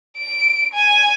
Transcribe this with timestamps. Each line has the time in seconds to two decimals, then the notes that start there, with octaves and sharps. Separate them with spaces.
0.18 D7
0.73 G#5